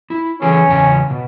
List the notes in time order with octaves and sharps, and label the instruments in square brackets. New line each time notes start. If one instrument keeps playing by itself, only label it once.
[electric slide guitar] E4
[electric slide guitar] E3 G#4 A4 [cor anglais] C#4
[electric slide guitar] E2 C#3 G#5
B2